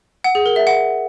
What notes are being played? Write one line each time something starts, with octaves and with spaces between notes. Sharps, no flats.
F#5
G#4
A#4
E5
F#5